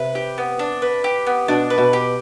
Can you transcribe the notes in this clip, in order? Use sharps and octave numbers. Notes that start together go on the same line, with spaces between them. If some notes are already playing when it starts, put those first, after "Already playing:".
Already playing: C3 B4
G4
B3
D4
B4
G4
B3
B2 D4
B4
B2
G4